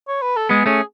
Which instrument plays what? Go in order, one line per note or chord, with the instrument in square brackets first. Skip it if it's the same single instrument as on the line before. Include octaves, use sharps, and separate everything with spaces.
[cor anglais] C#5
B4
A4
[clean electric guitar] G#3 B3 [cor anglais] G#4
[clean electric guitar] A3 C#4 [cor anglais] G#4